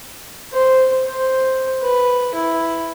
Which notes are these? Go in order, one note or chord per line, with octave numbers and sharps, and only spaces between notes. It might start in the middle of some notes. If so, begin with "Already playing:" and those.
C5
C5
B4
E4